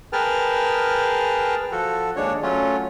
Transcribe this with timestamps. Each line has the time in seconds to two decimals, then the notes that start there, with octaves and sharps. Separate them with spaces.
0.13 G#4 A#4 B4 G5 A5 F6
1.72 F3 F#4 A4
2.16 D#2 G#3 D4 C#5
2.43 F#3 A3 C#4 F4